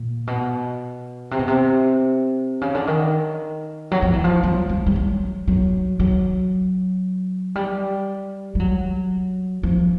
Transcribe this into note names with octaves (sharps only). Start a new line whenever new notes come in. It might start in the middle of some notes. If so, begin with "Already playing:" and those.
Already playing: A#2
B2
C3
B2
C3
C#3
D3
D#3
F#3
F3
E3
F3
F#3
G3
G3
F#3
F#3
F#3
G3
G3
F#3
F3